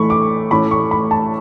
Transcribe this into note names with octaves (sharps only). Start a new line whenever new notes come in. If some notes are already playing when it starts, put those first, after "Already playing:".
Already playing: A2 E3 A3 B5 C#6
D6
A2 E3 A3 C#4 B5
C#6
B5
A5